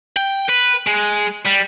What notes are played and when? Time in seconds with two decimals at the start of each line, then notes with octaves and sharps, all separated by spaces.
0.17 G5
0.49 B4
0.87 G#3
1.45 G3